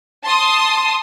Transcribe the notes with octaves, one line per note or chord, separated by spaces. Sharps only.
A5 C6 D#6